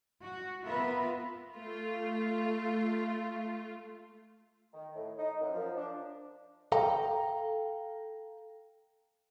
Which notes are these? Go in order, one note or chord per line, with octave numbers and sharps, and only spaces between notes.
F#4
B3 F4 A#4 B4 E5
A3 F4
D#3
A2
D#4
F#2
F3
D4
A4 F5 G5 A#5